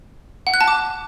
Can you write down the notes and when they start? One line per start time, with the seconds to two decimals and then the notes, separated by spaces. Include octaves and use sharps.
0.47 F#5
0.54 F#6
0.61 A5
0.68 D6